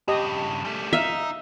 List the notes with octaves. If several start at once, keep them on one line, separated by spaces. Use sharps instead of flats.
G2 C#3 G4 D#5
G3 A3
D#4 E5 F5